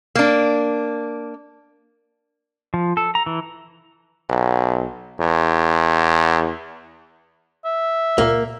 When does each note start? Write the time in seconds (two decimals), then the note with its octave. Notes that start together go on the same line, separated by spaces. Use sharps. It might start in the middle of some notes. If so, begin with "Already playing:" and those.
0.15 A#3 D4
2.74 F3
2.97 A4
3.15 A#5
3.26 E3
4.29 B1
5.20 E2
7.65 E5
8.18 C#2 A#2 A#3